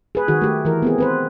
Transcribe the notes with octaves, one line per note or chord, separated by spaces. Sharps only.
G#4 B4
D#3 F#4 G#4
A3 G4
E3 A#4
B3 C4 G#4
C4 B4 C5